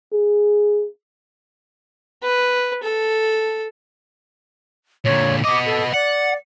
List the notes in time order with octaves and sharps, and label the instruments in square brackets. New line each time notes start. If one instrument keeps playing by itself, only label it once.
[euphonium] G#4
[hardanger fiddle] B4
A4
[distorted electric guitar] A#2 D3 [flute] C#5
[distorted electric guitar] B3 D#5 [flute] D6
[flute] A4
[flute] D5 [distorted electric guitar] F#5